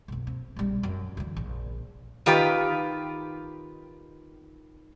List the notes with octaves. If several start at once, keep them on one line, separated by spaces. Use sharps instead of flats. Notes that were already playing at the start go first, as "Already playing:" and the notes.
B1 F#2
C4
A#1 G3
F#2
D3 E3
A#1
D#3 F4 G4 B4